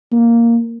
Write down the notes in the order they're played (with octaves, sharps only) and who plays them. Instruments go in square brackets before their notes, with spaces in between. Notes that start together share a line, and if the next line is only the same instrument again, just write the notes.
[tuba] A#3